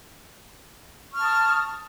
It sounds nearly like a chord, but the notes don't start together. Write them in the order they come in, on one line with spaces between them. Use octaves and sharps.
C#6 F6 A5 D#6